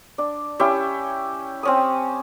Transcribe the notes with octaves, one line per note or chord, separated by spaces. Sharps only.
D4
C#4 E4 G4 G5
C4 C#4 D#6